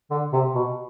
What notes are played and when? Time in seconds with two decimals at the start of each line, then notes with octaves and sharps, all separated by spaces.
0.11 D3
0.33 C3
0.55 B2